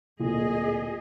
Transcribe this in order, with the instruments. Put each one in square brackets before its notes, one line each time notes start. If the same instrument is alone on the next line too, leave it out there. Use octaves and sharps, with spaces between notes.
[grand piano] D1 A#2 [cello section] G#4 D#5